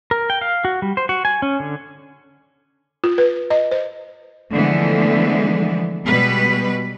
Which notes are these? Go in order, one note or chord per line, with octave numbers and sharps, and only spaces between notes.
A#4
G5
F5
F#4
G3
C5
F#4
G#5
C#4
D3
F4
B4
D#5
C5
D3 E3 F3 G#3 A3 B3
B2 G3 G#3 B3 B4